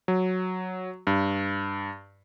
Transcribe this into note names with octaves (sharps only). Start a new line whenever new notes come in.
F#3
G2